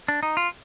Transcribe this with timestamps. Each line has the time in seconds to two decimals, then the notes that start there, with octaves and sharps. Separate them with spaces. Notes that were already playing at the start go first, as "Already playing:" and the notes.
0.08 D4
0.23 D#4
0.37 F4